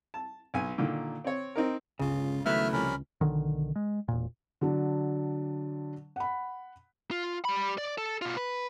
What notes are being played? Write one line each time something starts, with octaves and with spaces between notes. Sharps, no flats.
A5
B1 G#5
A#2 D3 D#3
C4 C#5
C4 D#4 A#4
G1 C#2 C#3 F4
D#3 F#3 A3 B3 E4 B4 E5 F6
C3 F3 G3 C#4 A#4 B5
B1 B2 D3 D#3
G#3
E1 A#2
D3 F#3 D4
F#5 B5
F4
G3 B5
D5
A4
B2 F4
B4